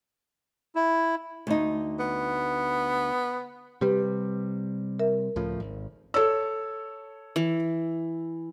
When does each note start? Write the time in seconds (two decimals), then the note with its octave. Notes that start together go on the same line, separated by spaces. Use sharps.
0.75 E4
1.47 D2 D#4
1.99 B3
3.81 C3 G3 G4 B4
5.00 A#4 E5
5.36 C#2 A2 F3
5.60 G#1
6.14 A4 C#5 E6
7.36 E3